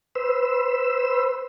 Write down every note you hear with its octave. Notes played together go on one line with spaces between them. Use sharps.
B4 C5 E6